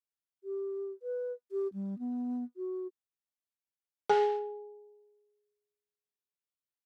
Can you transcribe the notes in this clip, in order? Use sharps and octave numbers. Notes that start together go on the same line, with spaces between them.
G4
B4
G4
G3
B3
F#4
G#4 G#5